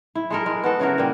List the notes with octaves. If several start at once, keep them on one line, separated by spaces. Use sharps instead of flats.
E4
G#3 A4 A#4
G#3
B3 F#4 A4
C#3 E4 F#4 A#4
A#2 G3